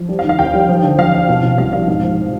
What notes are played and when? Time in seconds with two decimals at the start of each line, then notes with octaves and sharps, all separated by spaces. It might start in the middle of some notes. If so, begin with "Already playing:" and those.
Already playing: F3
0.09 G3
0.19 F5
0.24 D#3
0.29 F5
0.39 D#2 G5
0.54 G3
0.69 F3
0.83 D3
0.98 F3 F5
1.13 F3
1.29 B2
1.43 B2
1.58 C2 F5
1.73 G3 F5
1.88 G#2
2.03 F3